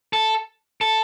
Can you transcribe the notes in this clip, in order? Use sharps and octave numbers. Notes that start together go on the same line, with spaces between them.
A4
A4